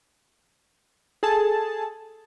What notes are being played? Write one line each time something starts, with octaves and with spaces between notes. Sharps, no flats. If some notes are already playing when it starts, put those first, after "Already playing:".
G#4 A4 A5